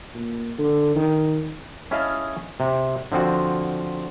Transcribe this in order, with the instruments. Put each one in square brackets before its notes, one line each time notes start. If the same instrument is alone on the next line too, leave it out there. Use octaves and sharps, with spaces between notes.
[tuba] A#2
D3
D#3
[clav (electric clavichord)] C#4 E4 G#4 D#5 F5 A5
C3
D3 F3 C4 F#4